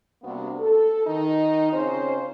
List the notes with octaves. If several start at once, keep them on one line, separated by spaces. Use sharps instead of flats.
C3 G3 A#3 B3 D4 F#4
A4
D#3 D#4
C#3 C4 C#4 F4 C5